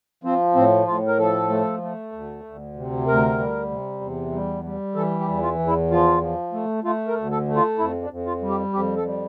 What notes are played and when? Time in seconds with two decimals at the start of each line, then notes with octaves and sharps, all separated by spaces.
0.24 F3 C4
0.55 A2 C4
0.87 A2 F4
1.07 A#4
1.18 F3 A4
1.50 A3
1.82 A3
2.12 D2
2.44 D2
2.76 C3
3.07 D2 A#4
3.39 G3
3.70 C3
4.01 E2
4.32 G3
4.64 G3
4.95 E3 A4
5.19 G4
5.28 E2
5.42 F4
5.59 E2
5.67 E4
5.91 F3 F4
6.21 F3
6.53 A3
6.84 A3 F4
7.08 A#4
7.16 D2
7.31 A4
7.48 A3
7.56 F4
7.78 F2 E4
8.02 D4
8.10 F2
8.26 F4
8.41 G3
8.49 G4
8.73 F2 G4
8.97 A4
9.05 G3